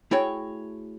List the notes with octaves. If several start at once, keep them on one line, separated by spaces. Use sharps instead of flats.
A3 E4 F#4 G#4 C#5 G5